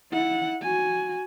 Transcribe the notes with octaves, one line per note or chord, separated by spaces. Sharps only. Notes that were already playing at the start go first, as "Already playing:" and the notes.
E4 F#5
F#4 G#5